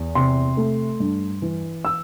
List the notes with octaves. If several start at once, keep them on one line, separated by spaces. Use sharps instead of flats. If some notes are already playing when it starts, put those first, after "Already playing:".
Already playing: E2
C3 C6
A3
G2
E3
E6